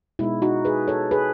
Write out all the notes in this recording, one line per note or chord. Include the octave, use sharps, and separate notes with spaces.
B2 G#3 B3 D#4 E4
D#4 F#4
G#4 B4
A4 C#5
G#4 B4